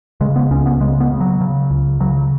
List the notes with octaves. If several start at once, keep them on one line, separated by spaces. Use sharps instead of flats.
C#3 G#3
B3
C#2 C#4
B3
C#3 G#3
B3
C#3
F#3
C#3
C#2
C#3 F#3